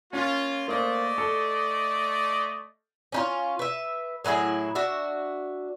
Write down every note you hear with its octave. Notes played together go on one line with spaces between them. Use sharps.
A#3 C#4 F4
A3 A#3 C5 D5 D#5
A4
C#4 D#4 F4
B4 E5
A2 F#3 E4 G#4
D4 F#4 E5